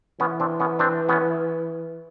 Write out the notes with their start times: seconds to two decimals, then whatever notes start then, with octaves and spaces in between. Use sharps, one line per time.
0.20 E3 B3 C#4
0.40 C4 D4
0.60 B3 C#4
0.79 C4 D4
1.09 B3 C#4